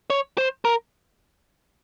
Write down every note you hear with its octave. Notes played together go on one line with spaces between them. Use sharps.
C#5
C5
A#4